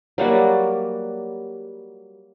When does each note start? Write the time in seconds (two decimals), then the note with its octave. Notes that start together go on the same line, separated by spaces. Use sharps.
0.18 F#3 G3 A#3 F#4